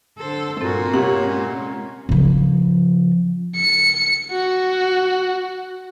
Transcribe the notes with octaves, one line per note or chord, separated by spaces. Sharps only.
D3 A4 C5
G2 A#2 C4 F#4 A4
C3 A#3 C#5 F#5
G#3 C#4
C#3 F3
C#7
F#4